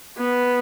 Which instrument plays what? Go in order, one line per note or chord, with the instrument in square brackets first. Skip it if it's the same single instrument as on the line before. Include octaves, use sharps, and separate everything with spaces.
[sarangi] B3